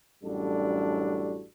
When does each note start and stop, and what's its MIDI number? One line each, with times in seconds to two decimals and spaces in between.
0.24 1.45 33
0.24 1.45 42
0.24 1.45 55
0.24 1.45 62
0.24 1.45 66
0.24 1.45 69